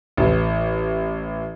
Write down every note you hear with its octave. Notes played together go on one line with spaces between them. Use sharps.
A1